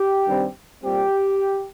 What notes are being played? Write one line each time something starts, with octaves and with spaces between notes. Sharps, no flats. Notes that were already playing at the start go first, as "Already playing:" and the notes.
Already playing: G4
G2 D#3 G3 C4
A#2 G3 C4 G4